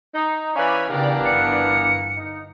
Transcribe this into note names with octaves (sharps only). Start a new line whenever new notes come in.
D#4
E3 C#4 D5 F5 G#5 B5
C#3 E3 B3 D4 G4 A#4 D5 F5
G1 C#7
D#4